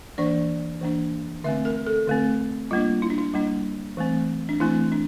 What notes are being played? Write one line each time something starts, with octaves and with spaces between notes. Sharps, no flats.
E3 A#3 D4 D5
E3 A#3 D4
D3 A3 C4 E5
A#4
A4
D3 A3 C4
G3 A#3 D4 F4
E4
D4
E4
G3 A#3 D4
E3 A3 C4
D4
E3 A3 C4 E4
D4